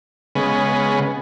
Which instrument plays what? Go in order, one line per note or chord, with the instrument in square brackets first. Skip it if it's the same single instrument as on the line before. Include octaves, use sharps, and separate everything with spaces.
[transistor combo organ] C#3 G#3 B3